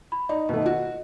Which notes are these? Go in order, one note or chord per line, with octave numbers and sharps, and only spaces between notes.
B5
D#4 D5
B2 D#3 A3 D#5
F#4